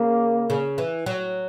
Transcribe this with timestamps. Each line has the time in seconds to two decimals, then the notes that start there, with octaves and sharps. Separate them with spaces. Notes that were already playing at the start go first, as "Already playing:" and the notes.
Already playing: C#3 A#3
0.50 C#3
0.78 E3
1.06 F#3